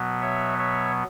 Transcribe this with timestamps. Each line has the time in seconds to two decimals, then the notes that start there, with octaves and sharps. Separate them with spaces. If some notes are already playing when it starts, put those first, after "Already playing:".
Already playing: B2 F#3 B3
0.21 C#5 E5
0.58 C#5 E5